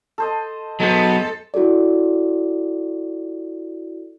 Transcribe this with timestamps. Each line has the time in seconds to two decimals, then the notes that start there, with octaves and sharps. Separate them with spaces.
0.18 A4 C5 D#5
0.80 F#3 G#3 B3 A4 C5
1.54 E4 F#4 G4 A4 D5